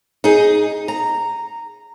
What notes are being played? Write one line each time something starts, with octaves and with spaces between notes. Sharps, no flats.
D#4 G#4
A#5